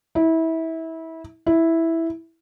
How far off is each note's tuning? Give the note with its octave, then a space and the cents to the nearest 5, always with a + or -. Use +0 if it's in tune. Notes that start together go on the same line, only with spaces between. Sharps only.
E4 -25
E4 -5